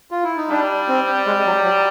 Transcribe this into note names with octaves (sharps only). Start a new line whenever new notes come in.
F4
E4
D#4
G3 D4
C4
G#3
F#3
F#3